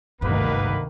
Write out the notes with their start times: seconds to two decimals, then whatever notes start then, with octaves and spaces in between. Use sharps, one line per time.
0.21 G#1 D2 G2 C3 D#3 A#3 B3 B4